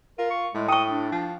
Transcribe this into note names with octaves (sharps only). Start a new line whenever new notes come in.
F4 A#4
C#6
A2 G#3
G5 C#6 D#6
D4
F3